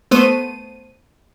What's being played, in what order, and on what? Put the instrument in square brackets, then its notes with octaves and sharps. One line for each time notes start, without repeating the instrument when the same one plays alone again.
[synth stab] A3 B3 C5 D#7